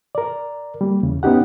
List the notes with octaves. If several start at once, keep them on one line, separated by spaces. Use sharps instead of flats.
A#4 D5
G3 A#3
E2 C#3
B3 C#4 D#4 G4 F#5